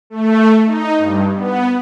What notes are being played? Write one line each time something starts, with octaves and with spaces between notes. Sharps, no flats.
A3
D#4
G2
B3